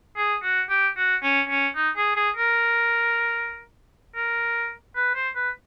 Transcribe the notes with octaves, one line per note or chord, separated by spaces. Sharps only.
G#4
F#4
G4
F#4
C#4
C#4
D#4
G#4
G#4
A#4
A#4
B4
C5
B4